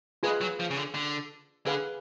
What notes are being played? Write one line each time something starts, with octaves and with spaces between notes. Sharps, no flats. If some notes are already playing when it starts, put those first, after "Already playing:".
G#3 F4 G#4 B4
F#3
F3
C#3
D3
D3
D3 G#4 B4 F5 G#5